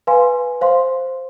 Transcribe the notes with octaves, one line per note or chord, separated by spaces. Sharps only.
B4 F5 G#5 C6
C5 F5 C6